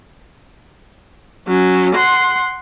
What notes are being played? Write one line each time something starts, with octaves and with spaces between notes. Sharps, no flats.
F#3 C#4
F#5 C6